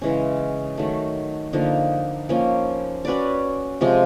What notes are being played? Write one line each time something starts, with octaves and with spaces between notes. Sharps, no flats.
C#3 E3 G#3 C#4
D#3 F#3 A3
D3 F3 A#3 D#4
F3 A#3 C#4
C#4 F#4 B4 D5
C3 F3 G#3